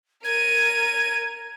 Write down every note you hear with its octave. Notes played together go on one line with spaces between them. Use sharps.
A#4 G#6 D#7